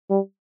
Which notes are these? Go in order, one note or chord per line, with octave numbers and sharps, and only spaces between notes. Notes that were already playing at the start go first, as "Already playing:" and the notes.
G3